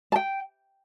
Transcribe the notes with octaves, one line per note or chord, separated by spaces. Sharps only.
A5
G5